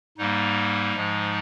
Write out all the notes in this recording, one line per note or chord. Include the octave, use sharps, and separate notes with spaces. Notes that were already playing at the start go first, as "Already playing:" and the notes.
G#2 G3 A#3 D#4
G#2 F3 G#3